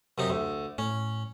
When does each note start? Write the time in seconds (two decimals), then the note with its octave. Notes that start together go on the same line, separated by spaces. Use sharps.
0.18 F#2 C3 D#4
0.30 D2
0.78 A2 C#4